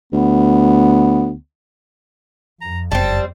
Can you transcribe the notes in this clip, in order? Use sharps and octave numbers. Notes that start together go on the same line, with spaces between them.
D2 B3
F2 A#5
F#1 G3 C4 A5